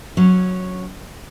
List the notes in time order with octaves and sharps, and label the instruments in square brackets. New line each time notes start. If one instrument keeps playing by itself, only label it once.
[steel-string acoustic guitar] F#3 C#4